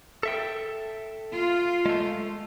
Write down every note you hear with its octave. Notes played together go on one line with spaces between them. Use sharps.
A4 E5 G5
F4
G#3 A3